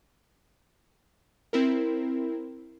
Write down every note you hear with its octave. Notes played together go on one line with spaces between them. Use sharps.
C4 E4 A#4